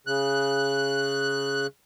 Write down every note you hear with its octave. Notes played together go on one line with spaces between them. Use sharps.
C#3 F#6